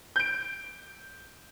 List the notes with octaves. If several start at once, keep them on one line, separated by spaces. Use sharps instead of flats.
G6 D7